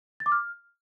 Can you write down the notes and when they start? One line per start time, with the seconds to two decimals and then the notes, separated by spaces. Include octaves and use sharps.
0.20 A6
0.26 D6
0.32 F6